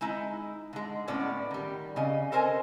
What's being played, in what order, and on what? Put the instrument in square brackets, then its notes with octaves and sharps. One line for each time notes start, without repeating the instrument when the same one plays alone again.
[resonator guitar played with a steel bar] G#3 D#4 E4
D3 G#3
A2 B3 C#4 D5
D#3 G3
C#3 D#5
A4 A#4 C5 D#5 G#5